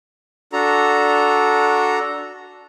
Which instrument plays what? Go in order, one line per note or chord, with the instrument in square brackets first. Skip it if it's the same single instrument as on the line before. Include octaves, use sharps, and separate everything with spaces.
[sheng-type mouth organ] D4 F#4 A4 A#5